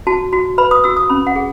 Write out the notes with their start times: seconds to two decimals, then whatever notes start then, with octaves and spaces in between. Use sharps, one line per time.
0.07 F#4 A5
0.33 F#4
0.58 B4 B5
0.71 D#6
0.84 F#4 E6
0.97 D#6
1.09 C#4 B5
1.27 F#5
1.36 G#4